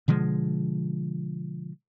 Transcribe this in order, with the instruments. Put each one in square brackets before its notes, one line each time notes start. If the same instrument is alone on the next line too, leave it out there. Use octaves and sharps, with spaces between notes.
[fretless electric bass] B2 D3 F3 G#3